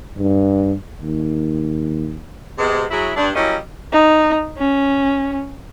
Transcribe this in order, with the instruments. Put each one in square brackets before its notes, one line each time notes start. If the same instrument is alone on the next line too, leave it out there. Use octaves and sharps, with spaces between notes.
[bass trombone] G2
D#2
[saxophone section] C3 G#3 B3
F#3 E4 G#4
G2 D4
F#3 G3 A#3 C#4 E4 D#5
[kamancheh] D#4
C#4